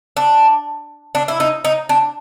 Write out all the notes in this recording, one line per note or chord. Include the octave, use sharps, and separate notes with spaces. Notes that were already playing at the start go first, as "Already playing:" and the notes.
D4
D4
E4
D#4
D#4
D4